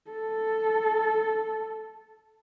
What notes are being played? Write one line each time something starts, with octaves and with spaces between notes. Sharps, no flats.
A4